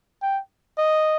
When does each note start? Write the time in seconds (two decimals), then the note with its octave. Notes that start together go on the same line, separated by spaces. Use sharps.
0.23 G5
0.78 D#5